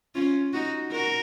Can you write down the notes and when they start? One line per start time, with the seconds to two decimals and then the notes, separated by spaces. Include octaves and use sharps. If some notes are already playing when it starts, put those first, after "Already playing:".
0.15 C#4 F4
0.53 D#4 F#4
0.92 F#4 A#4